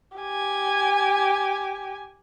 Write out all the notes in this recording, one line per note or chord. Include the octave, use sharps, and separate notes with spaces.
G4 G#5